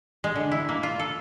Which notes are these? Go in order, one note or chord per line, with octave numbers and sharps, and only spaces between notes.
G#3
D3
E4
A#3
F4
A4